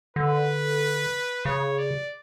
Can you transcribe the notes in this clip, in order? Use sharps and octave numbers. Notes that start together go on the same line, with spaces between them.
D3 B4
C#3 C#5
D5